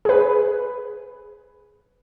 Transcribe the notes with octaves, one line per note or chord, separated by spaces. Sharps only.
G#4 B4